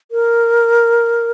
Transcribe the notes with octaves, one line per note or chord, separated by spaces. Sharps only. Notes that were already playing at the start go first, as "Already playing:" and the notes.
A#4